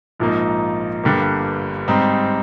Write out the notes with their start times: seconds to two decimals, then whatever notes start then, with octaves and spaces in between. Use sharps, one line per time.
0.20 A#1 G#2 F3 A#3 D#4
1.04 G1 G2 D3 G3 A#3
1.88 G#2 G3 C4 D#4